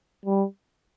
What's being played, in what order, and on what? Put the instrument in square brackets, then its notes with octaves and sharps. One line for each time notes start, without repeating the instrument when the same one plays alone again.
[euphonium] G3